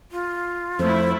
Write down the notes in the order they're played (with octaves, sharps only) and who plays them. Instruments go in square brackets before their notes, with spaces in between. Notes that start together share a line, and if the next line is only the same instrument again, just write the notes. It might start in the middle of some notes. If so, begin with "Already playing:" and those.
[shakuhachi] F4
[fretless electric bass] F2 [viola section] A3 E4 [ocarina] C5